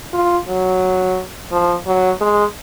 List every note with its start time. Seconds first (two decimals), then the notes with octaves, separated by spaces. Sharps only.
0.14 F4
0.48 F#3
1.52 F3
1.87 F#3
2.21 G#3